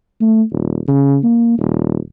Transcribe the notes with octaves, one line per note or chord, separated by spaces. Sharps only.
A3
D#1
C#3
A#3
D#1